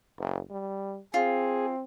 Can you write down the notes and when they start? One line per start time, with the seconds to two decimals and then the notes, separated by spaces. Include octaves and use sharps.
0.19 F#1
0.50 G3
1.14 C4 F4 G#4